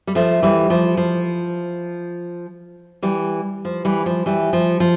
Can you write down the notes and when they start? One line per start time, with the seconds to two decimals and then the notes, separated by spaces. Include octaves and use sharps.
0.07 G3
0.15 F3 A3
0.42 E3 G3
0.70 F3
0.97 F3
3.02 E3 G3
3.65 F3
3.85 E3 G3
4.06 F3
4.26 E3 G3
4.53 F3
4.80 F3